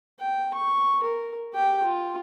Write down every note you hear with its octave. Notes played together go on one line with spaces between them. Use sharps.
G5
C#6
A#4
G4 G5
F4